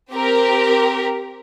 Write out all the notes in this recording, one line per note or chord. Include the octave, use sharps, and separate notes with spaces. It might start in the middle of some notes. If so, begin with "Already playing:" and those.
C4 G4 A#4